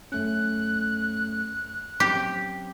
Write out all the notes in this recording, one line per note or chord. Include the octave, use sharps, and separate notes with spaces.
F#2 A3 C#4 F#6
F#3 C4 C#4 G4